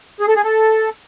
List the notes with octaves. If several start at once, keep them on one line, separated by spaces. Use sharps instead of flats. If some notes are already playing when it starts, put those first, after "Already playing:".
G#4
A4
G#4
A4